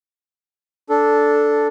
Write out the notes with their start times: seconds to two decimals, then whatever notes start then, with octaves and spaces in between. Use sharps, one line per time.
0.90 D4 A4